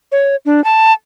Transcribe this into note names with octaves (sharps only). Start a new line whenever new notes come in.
C#5
D4
A5